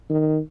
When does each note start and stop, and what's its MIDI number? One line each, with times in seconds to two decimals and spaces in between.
0.10 0.39 51